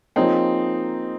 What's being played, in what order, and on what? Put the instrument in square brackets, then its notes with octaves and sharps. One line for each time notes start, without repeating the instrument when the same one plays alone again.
[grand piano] F3 A#3 F4 G#4 C#5 [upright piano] C4 D#4